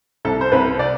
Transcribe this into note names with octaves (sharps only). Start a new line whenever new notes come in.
C2 A4
C5
C2 B4
D5